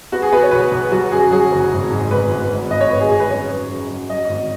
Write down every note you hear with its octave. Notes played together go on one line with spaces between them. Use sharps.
B3 F#4
G#4
B3 B4
C#5
B1 B4
B1
F#3 F#4
F#2 G#4
F#3 G#4
F#1
G#1
G#2
G#1 B4
G#1
G#1
G#1 D#5
C#5
G#1 B4
G#4
G#1 G#4
B4
F#2 C#5
F#2
F#2
F#2
F#3 D#5
G#1